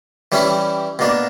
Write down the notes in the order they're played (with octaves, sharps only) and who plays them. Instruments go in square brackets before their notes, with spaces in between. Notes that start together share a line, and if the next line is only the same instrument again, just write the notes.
[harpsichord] E3 G3 C#4 E4
B2 A#3 D4